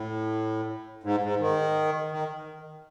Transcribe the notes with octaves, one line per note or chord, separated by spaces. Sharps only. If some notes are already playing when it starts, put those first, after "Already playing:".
Already playing: A2
G#2
G#2
D#3
D#3